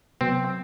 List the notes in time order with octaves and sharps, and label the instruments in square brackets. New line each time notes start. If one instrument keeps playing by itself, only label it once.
[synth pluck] C3 F#3 B3 [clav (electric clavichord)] C4